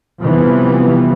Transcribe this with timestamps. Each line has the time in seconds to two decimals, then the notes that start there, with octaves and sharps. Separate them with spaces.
0.20 C3 E3 F3 G3 B3 C4